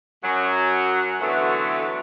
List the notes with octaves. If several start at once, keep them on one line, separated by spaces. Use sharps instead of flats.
F#2 F#3
D3 E3 F#3 A3 B3